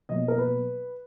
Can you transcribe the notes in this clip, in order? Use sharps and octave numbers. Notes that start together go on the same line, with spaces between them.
B2 F#3 A#3 D#5
A#4
B4